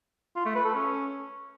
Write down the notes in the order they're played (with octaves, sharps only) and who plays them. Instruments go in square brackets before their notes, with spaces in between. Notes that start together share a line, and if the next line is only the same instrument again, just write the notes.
[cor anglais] F4
A3
B4
A4
C#4